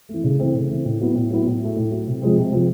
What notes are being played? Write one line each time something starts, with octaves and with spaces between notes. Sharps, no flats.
A3
E3
C#3
E3 A3 C4
C#3
E3 A3 C4
A2
F#3 B3 E4
A2
F#3 B3 E4
A2
F#3 A3
A2
F#3 A3
C3
F3 G#3 C4
C3
F3 G#3 C4